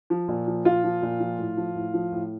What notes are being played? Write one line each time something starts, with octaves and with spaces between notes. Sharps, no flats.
F3
A#2
F3
A#2 F4
F3
A#2
F3
A2
F3
A2
F3
A2